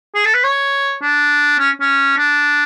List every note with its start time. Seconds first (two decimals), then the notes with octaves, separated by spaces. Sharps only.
0.15 G#4
0.25 A4
0.34 B4
0.44 C#5
1.02 D4
1.59 C#4
1.81 C#4
2.18 D4